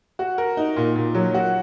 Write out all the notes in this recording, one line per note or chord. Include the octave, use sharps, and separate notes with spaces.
F#4
A#4
D#4
A#2
A#2
F#3
F#4